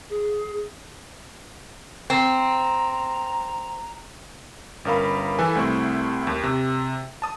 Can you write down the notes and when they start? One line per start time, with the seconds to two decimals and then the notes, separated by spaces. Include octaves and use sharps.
0.10 G#4
2.10 C4 A#5
4.85 G1 C#4 A#4 F5 B5
5.39 E3 A4 B4 G#5
5.55 C2 A3 C4 E4 C#6
6.27 D#2
6.43 C3
7.22 A5 D#6